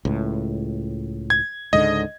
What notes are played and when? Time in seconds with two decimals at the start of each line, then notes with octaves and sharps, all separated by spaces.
0.05 C#2 A2
1.30 G#6
1.73 C#2 G#2 D3 D#5